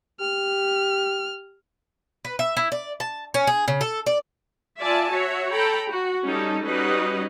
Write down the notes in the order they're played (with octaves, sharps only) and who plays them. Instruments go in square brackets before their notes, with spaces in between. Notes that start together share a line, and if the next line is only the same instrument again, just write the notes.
[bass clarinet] G4 [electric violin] F6
[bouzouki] B4
E5
E4
D5
A5
C#4
G#4
C#3
A4
D5
[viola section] F4 D5 E5 G#5 A5
F#4 C#5 E5
A4 G5 A#5 B5
F#4
G3 C#4 D#4 A4
G3 C#4 D#4 F#4 B4 D#5